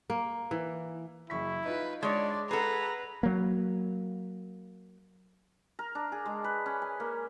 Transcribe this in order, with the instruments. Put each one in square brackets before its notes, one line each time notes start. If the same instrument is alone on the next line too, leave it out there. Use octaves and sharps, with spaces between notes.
[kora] A#3
E3
[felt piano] F#1 C#6 B6 [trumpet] E4
[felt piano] D#4 F4 [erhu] B4
[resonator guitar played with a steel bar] G#3 C#5 [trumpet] D4 [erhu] D5
[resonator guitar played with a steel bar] G#4 A4 [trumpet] B4 [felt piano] F#5 B5 [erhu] A#5
[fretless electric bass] F#3 A#3
[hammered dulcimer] A#4
D4
G#4
G#3
B4
C#4
G#5
A#3